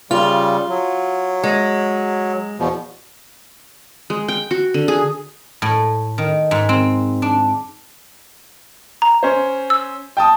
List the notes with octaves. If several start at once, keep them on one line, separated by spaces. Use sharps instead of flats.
C#3 G3 F4
F#3
G#3
E2 B2 F3
G#3
G5
F#4
D3
G#4
A2
D#3
G#2
C4
D4
A#5
C#4 C5
E6
G5 A5 D#6